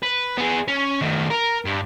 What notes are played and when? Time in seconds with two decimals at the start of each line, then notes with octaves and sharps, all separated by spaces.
0.03 B4
0.38 B3 G#4
0.68 C#4
1.01 D#3 A3
1.30 A#4
1.65 G2